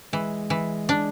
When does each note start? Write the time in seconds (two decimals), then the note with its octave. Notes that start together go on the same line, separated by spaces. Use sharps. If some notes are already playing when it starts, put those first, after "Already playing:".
0.13 E3 G#3
0.50 E3
0.89 D4